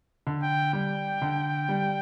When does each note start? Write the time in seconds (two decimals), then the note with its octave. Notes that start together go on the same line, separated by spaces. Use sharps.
0.27 D3
0.43 G5
0.73 G3 G5
1.22 D3
1.69 G3